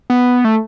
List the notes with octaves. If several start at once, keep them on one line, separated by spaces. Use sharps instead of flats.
B3
A3